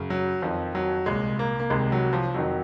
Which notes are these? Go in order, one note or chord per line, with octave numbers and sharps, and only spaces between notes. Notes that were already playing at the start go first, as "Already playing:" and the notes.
Already playing: F#2 C#3
F#3
F2 D#3 F3
F#3
C2 A#2 G#3
A#3
A#3
C2 C3 D#3 G#3
F#3
F3
F2 D#3 F#3